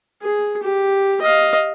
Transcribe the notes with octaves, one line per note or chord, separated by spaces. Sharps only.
G#4
G4
D#5 F5